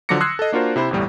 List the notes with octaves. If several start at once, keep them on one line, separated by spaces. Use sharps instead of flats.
D3 F3 F#3 D6 A#6 C#7
C6 D#6 E6 F#6 G#6 C7
A4 D#5
A#3 D4 F4 F#4 A#4 C5
C3 E4 C5 B5
G1 E2 A2 G3